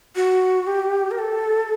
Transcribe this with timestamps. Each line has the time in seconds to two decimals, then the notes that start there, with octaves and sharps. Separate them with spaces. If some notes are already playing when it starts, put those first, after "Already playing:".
0.16 F#4
0.67 G4
1.11 A#4
1.18 A4